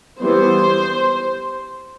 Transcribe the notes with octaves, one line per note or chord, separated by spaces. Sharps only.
E3 G3 B3 C5